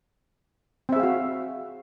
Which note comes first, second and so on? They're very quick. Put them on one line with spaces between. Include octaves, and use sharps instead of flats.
C4 E5 G#4 F5 F#4